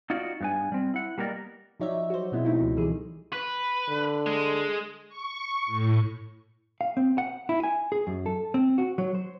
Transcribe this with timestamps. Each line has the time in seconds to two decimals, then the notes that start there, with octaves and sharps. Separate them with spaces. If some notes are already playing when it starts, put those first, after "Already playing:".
0.10 D#4 F4 F#4 D5
0.41 G2 B3 G#5
0.72 G3 C4
0.94 E4 F#5
1.18 G3 A#3 B3 A#4 D5 D#5
1.80 F3 F#3 D#4 C#5 D5 E5
2.10 F#4 C5
2.32 B2 G#3 B3 C4 E4
2.45 A3 D#4 E4
2.59 C#2 F3 A3
2.76 E3 G3 A3 G#4
3.33 B4
3.88 D3
4.26 G#3
5.09 C#6
5.66 A2
6.81 F5
6.97 C4
7.18 F#5
7.49 E4
7.63 G#5
7.92 G#4
8.07 F#2
8.26 A4
8.54 C4
8.78 F#4
8.98 F#3
9.15 C5